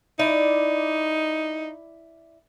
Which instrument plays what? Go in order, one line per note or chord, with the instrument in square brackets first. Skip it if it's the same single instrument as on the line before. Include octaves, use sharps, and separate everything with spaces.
[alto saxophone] D#4 [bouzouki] E4 D5